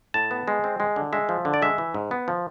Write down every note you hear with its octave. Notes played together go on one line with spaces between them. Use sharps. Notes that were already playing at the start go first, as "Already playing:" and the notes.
A2 A5
B3
G#3
C4
G#3
D3
G#3 E5
F3
D3
D5
G#3 E5
E3
G#2
B3
F3